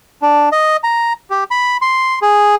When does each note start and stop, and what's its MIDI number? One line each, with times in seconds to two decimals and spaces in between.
0.22 0.49 62
0.52 0.77 75
0.84 1.13 82
1.30 1.44 67
1.51 1.77 83
1.82 2.19 84
2.22 2.55 68